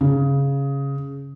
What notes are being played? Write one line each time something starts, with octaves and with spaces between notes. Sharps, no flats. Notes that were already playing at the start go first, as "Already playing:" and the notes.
C#3